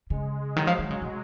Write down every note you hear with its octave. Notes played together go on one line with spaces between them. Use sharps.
C#3 G#3
D#3 F#3
F3
D#3
C#3
C3